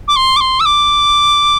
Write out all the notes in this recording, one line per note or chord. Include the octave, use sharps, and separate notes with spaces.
D6
C6
D6
C6
E6
D6